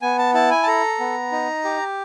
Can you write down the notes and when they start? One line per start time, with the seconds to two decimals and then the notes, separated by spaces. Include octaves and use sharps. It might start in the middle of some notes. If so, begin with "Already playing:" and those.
0.02 B3 G#5
0.19 A5
0.34 E4 A5
0.51 G#5
0.63 A5
0.67 A4 A#5
1.00 B3
1.32 D#4
1.65 G4